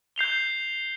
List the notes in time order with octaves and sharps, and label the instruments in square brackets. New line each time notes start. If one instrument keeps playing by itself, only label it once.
[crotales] G6 C7 F7 G7